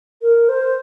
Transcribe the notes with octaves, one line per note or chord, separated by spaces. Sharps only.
A#4
C5